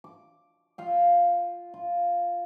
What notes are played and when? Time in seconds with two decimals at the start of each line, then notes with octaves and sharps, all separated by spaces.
0.04 D6
0.78 F4 F5 G5
1.74 F4